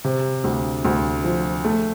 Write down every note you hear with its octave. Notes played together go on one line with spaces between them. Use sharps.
C3
D2
D2
F3
A3